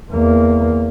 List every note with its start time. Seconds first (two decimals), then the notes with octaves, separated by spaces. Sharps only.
0.12 E2 A#3